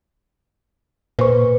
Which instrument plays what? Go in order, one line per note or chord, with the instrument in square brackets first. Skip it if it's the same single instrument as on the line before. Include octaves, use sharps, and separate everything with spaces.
[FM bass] A#2 [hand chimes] B4 C5 C#6